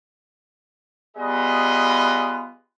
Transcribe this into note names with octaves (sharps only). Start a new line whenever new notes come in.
G3 B3 F4 G#4 B4 D#5